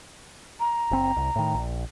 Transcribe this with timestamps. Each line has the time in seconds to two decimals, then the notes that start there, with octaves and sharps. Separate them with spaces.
0.59 A#5
0.91 F#1 C4
1.16 C2
1.36 A2 D#3
1.54 A#1